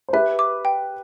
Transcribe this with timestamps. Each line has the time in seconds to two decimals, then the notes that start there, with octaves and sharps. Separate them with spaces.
0.09 C5
0.13 G4 B4 E5
0.39 D6
0.65 G5